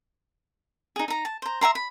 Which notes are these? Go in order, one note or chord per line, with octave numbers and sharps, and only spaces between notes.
D#4 G#4
D#4 A#5
A5
C5 A#5
E5 G5 A#5 C6
B5